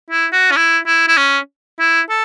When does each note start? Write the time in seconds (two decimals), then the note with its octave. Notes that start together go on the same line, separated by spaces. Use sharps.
0.11 E4
0.32 F#4
0.51 C#4
0.57 E4
0.86 E4
1.08 E4
1.17 C#4
1.79 E4
2.10 A4